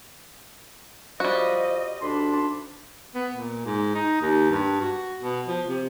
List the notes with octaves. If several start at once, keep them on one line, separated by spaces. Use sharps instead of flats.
F3 G3 F#4 D#5
D2 D4 B5 C6
B3
A#2
G#2
D#4
D#2
G2
F#4
B2
F3
C3